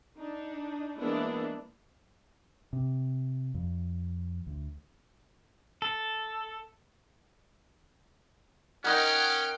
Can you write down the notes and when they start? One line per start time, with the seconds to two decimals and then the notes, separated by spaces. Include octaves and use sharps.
0.18 D4 D#4
0.99 E3 G#3 A#3 B3 D4 E4
2.73 C3
3.54 F2
4.47 D2
5.82 A4
8.84 C#4 D#4 A#4 F#5 G5 F6